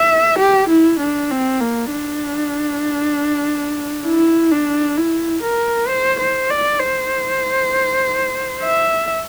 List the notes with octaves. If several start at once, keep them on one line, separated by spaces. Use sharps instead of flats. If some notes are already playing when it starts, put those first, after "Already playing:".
Already playing: E5
G4
E4
D4
C4
A#3
D4
E4
D4
E4
A#4
C5
C5
D5
C5
E5